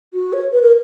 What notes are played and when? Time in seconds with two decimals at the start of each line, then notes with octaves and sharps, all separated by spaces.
0.13 F#4
0.32 C#5
0.52 B4
0.61 A#4